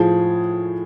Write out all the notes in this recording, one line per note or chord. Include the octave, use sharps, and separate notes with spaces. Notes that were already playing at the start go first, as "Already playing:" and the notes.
Already playing: A2 F3 G#4